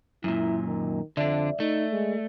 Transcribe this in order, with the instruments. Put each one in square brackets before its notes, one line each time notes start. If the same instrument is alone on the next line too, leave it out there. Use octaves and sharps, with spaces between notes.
[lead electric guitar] F#2 A#2 [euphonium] E4
[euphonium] D#3
[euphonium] F2 [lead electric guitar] D3 D4 [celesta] D5 E5
[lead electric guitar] A3 [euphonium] D#4
[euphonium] G#3